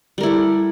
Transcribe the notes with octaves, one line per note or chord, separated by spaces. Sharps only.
G3 E4 A4 A#4